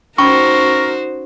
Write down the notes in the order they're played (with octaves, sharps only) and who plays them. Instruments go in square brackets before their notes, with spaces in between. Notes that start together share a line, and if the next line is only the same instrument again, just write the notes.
[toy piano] C#4 B5 E6 [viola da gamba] D#4 F#4 C5 [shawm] A#4 [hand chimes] C#6